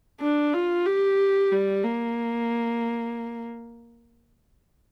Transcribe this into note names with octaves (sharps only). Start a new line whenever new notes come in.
D4
F4
G4
G3
A#3